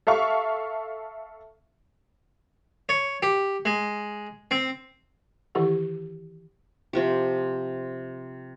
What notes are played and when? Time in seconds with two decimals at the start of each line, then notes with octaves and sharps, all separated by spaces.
0.07 A4 E5 F5 C#6
2.89 C#5
3.23 G4
3.65 G#3
4.51 C4
5.55 D#3 E3 E4 G4 A4 F#5
6.93 C3 F3 G4